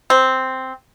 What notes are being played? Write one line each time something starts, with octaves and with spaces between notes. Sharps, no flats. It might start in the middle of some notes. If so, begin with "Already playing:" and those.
C4